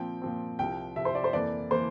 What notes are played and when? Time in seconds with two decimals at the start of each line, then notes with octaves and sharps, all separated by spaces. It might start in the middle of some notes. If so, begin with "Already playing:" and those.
Already playing: A#2 F3 C4 G5
0.22 A#2 F3 C4
0.59 C2 C3 F3 G5
0.96 C2 C3 F3 E5
1.05 C5
1.15 D5
1.24 C5
1.33 F2 E3 A#3 D5
1.71 E3 A#3 C5